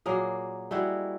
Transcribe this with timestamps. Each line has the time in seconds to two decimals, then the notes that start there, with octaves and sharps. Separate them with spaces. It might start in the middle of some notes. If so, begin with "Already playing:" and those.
0.06 A#2 F#3 A#3 G#4
0.71 G3 G#3 E4 F#4